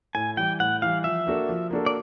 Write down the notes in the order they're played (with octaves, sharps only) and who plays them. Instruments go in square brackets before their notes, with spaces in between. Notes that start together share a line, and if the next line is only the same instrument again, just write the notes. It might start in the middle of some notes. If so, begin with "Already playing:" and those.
[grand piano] A2 [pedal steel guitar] G#5
[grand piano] E3 G3 [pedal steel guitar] G5
[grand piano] A2 [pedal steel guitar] F#5
[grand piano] E3 G3 [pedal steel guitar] F5
[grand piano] F3 [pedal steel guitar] E5
[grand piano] A#3 D4 F#4 A4
F3
A#3 D4 F#4 A4
[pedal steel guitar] D5